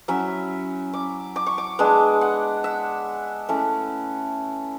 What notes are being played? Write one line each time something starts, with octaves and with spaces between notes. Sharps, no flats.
F#3 C#4 E4 E5
D6
D6
C#6
D6
G#3 B3 D4
F#5
E5
A3 C#4 E4